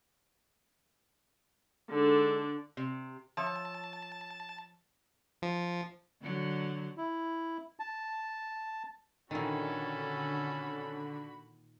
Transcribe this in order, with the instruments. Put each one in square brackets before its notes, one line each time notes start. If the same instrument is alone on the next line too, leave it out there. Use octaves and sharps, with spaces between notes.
[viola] D3 D4 [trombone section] G#3 D#4 A4
[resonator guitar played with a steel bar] C3
[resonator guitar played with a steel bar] F3 C#5 E5 [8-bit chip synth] A5
[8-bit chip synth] F3
[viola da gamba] D3 F#3
[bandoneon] E4
A5
[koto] A#2 D#3 [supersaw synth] D3 [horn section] C#4 A4 [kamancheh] F#4 B5